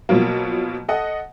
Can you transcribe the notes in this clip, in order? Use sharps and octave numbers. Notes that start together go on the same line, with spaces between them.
B2 F3 F#3 A#3
A4 D#5 F#5